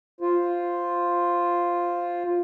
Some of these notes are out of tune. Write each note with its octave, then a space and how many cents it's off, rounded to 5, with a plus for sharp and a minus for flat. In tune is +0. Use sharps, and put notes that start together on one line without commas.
F4 +0 C5 +0